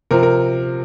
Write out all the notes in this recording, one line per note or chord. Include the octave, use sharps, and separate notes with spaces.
C3 F3 A#4
A#4